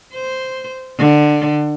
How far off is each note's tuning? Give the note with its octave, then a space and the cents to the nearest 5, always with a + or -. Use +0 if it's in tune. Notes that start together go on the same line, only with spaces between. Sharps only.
C5 -5
D3 +20